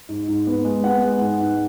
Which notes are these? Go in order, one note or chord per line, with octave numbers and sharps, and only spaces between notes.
G#2
G#2
B3
G#3
B3 F#5
G#3
G#2
G#2